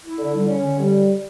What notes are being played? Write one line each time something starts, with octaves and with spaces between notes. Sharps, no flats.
E4
D3
G3
C#4
D3
G3